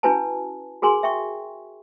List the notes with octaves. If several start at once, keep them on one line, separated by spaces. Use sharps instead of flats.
C#4 E4 F#4 B4 G#5 A5
F#4 G#4 A#4 G#5 C6
E5 G5 C#6